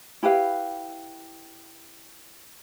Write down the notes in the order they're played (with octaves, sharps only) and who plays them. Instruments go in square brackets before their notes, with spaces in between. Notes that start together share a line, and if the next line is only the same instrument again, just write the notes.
[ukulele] E4 G4 B4 F5